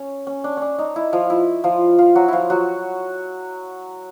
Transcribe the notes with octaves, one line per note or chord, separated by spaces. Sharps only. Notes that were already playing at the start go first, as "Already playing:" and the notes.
Already playing: C#4
C#4
D4
C#4 D4
D#4
E4
F3 F4
E4
F3 F4
F3 F4
F#3 F#4
F3 E4 F4
F#3 F#4